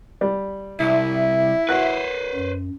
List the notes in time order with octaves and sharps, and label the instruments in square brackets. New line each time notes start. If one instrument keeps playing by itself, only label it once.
[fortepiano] G3
[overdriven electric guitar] C2 [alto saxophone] E4 [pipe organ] E5
[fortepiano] F#4 F#6 [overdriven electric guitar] B4 C5
[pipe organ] F#2